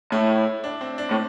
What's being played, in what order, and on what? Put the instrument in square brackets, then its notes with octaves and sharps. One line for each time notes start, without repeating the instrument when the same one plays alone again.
[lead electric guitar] A2 [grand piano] E4
[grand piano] D4
C4
D4
[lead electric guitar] A2